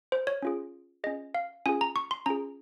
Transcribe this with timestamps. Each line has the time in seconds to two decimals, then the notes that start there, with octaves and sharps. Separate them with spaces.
0.12 C5
0.27 C#5
0.42 C#4 F4 G#4
1.04 C#4 F4 G#4 D#5
1.34 F5
1.66 C#4 F4 G#4 G#5
1.81 A#5
1.96 C#6
2.11 C6
2.26 C#4 F4 G#4 A#5